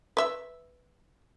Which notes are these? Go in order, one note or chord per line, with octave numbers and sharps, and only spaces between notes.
B4 E5